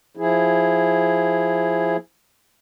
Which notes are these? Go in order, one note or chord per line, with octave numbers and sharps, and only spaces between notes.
F3 E4 G#4